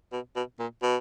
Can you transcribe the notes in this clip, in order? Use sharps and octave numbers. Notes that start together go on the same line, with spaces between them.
B2
B2
A#2
B2